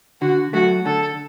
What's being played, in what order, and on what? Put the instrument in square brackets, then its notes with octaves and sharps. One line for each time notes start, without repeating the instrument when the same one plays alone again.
[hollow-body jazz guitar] D3 [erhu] F#4
[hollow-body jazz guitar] F#3 A3 [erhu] F#4
[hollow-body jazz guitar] D3 [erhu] A4